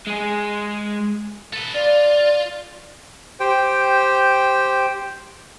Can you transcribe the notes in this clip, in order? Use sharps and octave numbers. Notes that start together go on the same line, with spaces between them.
G#3 G#4
A4 B4
F4 D5
G4 C5 G5